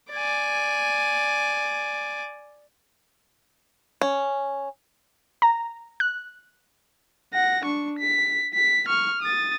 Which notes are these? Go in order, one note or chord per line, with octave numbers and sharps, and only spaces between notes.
D5 G#5
C#4
A#5
F#6
F#5 A#6
D4 C#6
B6
B6
C#6 F6
D#6 A6